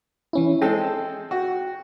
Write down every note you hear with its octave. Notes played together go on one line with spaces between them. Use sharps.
E3 C#4 E4
G#3 C4 A4 G5
F#4